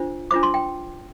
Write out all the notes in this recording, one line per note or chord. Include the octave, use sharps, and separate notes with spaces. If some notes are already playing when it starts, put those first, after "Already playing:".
Already playing: D4 F4 C5
D4 F4 C5 D6
C6
G5